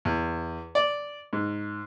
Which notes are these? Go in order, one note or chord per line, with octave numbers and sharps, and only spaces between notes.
E2
D5
G#2